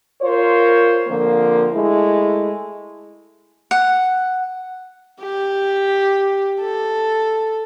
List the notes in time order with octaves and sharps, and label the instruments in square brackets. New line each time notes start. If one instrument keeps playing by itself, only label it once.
[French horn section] F4 A#4 C5 C#5
D3 F3 A#3 C4
G#3 A3 E4
[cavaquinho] F#5
[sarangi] G4
A4